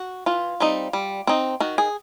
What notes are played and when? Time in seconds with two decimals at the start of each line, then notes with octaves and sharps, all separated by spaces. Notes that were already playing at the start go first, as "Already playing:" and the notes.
Already playing: F#4
0.26 E3 F4
0.60 G3 C4 D#4
0.93 G3
1.27 C4 D#4
1.60 D#3 F#4
1.78 G#4